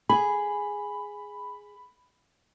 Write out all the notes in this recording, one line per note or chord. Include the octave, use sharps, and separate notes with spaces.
G#4 B5